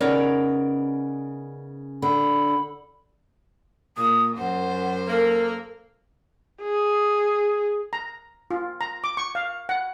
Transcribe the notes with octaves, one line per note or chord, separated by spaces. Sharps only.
C#3 B3 D#4 A#4 C#5 D5
D3 B5
A#2 D#6
F#2 C5 F#5
A#3 A4
G#4
A#5
F4
A#5
D6
C#6
F5
F#5